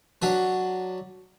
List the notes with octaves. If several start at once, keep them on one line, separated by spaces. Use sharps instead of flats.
F#3 D4 B4